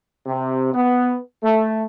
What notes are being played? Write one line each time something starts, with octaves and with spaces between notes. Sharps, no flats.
C3
B3
A3